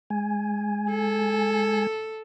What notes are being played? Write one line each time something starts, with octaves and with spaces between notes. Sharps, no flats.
G#3 G#5
A4